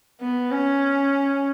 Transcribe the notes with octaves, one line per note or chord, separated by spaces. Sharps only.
B3
C#4